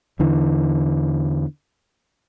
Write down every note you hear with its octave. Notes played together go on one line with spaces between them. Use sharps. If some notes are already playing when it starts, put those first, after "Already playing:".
E2 D3 E3